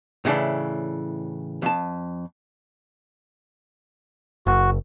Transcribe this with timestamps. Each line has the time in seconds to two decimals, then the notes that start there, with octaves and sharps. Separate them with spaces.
0.25 A2 C#3 E3 D4
1.62 F2 A5
4.47 F#1 F#4